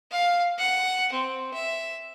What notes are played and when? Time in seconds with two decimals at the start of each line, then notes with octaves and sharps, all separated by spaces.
0.12 F5
0.59 F#5
1.13 C4
1.54 E5